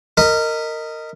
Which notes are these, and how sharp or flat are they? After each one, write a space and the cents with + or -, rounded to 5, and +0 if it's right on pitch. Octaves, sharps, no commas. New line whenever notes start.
A#4 -20 D#5 +0 B5 +0